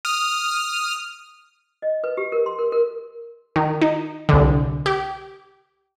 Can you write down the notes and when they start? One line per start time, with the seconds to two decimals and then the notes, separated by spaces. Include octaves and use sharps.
0.05 D#6 F6
1.82 D#5
2.04 B4
2.17 G4
2.32 A#4
2.46 C6
2.59 A#4
2.72 A#4
3.56 D#3
3.81 D#4
4.29 C2 D3
4.86 G4